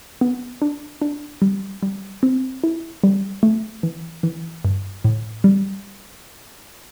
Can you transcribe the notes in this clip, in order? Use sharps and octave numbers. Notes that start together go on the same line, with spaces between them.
B3
D4
D4
G3
G3
C4
E4
G3
A3
E3
E3
G2
A2
G3